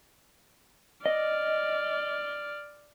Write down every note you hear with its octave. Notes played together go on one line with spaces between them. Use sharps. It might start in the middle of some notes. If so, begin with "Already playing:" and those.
D5 D#5 F6